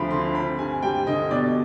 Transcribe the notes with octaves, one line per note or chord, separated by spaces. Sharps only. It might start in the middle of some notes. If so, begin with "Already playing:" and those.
Already playing: D2 F3 C4 B5
D3 C6
C4 B5
G2 G#5
G3 G5
D3 D#5
B2 D5